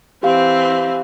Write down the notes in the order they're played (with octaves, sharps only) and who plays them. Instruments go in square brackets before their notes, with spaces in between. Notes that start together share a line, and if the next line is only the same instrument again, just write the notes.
[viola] E3 C4 [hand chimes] G4 F5